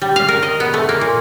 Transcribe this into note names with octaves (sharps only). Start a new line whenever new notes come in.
G3
F5
A#4
D#5
B3
A3
A#3
A#2